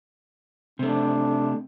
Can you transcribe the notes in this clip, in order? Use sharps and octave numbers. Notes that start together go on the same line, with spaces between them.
C3 A3 D4